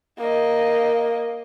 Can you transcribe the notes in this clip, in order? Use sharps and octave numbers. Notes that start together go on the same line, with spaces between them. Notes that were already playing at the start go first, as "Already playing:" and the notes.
A#3 D#5